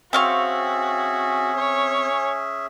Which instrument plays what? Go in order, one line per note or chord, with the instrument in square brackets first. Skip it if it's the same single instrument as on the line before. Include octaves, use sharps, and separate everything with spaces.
[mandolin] C4 F5 C#6 [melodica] C#4 G#4 E5 [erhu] F#4
[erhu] C#5